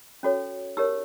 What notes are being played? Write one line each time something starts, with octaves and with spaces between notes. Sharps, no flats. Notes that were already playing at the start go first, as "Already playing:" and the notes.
C#4 F#4 A4 C#5
D#4 G4 A#4 C#5 E6